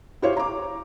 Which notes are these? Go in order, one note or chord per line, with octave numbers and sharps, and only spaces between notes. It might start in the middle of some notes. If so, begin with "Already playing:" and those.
E4 F#4 G4 C5 C#5 F5
A#5 D6